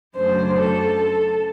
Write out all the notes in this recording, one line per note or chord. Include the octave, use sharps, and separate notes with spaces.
F#2 C#3 F#3 A3 D4 C5
A4